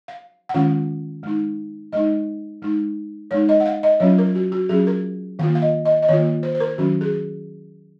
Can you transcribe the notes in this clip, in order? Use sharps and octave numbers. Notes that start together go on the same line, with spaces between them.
F5
F#5
D#3 G#3 C#4 F4 F5
G#3 D#4
G#3 D#4 D#5
G#3 D#4
G#3 D#4 C#5
D#5
F#5
F5
D#5
F#3 C#4 F4 C#5
A#4
F#4
F#4
F#3 C#4 F4 G#4
A#4
D#3 A#3 F4 F5
F5
D#5
D#5
D#5
D#3 A#3 F4 C#5
C5
C5
A#4
D#3 F#3 C#4 F#4
G#4